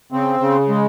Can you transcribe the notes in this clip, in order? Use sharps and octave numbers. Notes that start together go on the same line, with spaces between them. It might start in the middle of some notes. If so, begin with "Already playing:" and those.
C#3 C4
C#3
G#3